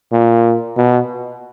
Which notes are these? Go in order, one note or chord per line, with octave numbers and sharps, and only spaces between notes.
A#2
B2